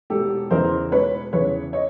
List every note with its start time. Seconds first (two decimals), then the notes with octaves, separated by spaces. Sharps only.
0.10 E1 G4 A4
0.51 E2 C#3 E3 A#4 C5
0.92 E1 B4 C#5
1.33 E2 C#3 E3 B4 C#5
1.73 C#5 D#5